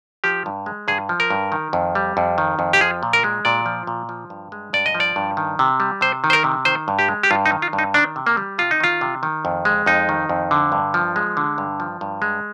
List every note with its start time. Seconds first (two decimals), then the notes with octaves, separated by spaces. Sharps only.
0.24 F3 G4
0.46 G2
0.66 G#3
0.88 G2 G#4
1.09 F3
1.20 A#4
1.30 G2
1.52 D#3
1.73 F2
1.95 G3
2.17 F2
2.38 D#3
2.59 F2
2.73 G4
2.81 F3 G#4
3.03 A#2
3.13 A#4
3.24 G#3
3.45 A#2 D5
3.66 F3
3.87 A#2
4.09 F3
4.30 G2
4.52 G#3
4.73 G2 D5
4.86 D#5
4.94 F3
5.00 D5
5.16 G2
5.37 D#3
5.59 C3
5.80 G3
6.01 C3 C5
6.24 D#3
6.30 C5
6.33 A#4
6.44 C3
6.65 D#3 C5
6.88 G2
6.99 G4
7.08 G#3
7.23 G4
7.31 G2 F4
7.46 D#4
7.52 D#3
7.62 F4
7.73 G2
7.79 D#4
7.94 D#3 D4
8.16 C3
8.27 A#3
8.37 G3
8.58 C3 F4
8.71 D#4
8.80 D#3 F4
9.01 C3
9.23 D#3
9.45 F2
9.65 G#3
9.86 F2 D#4
10.09 D#3
10.29 F2
10.51 D3
10.72 G2
10.94 F3
11.16 G#3
11.37 D3
11.58 G2
11.80 F3
12.01 G2
12.22 G#3